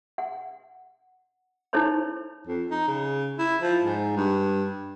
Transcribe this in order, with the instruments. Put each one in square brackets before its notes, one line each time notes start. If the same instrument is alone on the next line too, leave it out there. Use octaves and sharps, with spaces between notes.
[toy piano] F#5
D#4 E4 A4 C5 C#5 B5
[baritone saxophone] F2
D#4
C#3
E4
F3
G#2
G2